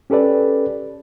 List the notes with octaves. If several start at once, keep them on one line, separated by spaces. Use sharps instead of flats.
C#4 G4 A4 B4 D5